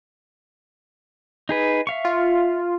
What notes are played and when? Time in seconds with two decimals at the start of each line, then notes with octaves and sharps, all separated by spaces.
1.49 D#4 G#4 B4
1.87 E5 F5 C#6
2.05 F4